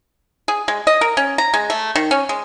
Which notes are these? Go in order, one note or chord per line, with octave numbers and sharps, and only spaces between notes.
G#4
G#3
D#5
A#4
C#4
A#5
G#3
A3
D#3
C#4
G#3